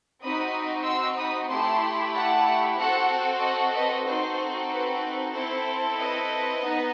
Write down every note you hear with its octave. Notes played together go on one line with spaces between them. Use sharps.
C4 D#4 F#4 B5 D#6
C6 E6
B5 D#6
A3 E4 G4 A5 C6
F#5 A5
C4 F#4 A4 F#5 A5
D#5 F#5
B4 D#5
C4 D#4 F#4 A4 C5
B4
C4 E4 A4 C5
B4 D#5
B3 D#4